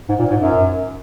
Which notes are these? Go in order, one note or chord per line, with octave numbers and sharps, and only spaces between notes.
G#2
A#2
G#2
F#2